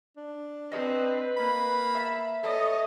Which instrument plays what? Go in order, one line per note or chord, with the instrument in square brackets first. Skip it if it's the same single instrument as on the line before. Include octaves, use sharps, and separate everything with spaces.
[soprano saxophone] D4
[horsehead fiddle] C4 [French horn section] B4 [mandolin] D#5 E6
[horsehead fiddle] A#3 [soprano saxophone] B5
[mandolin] E5 F5 A5
[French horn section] G2 C#5 [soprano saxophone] A4 [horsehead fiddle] D#5